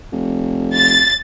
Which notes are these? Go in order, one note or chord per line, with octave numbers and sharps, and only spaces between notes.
F1
A6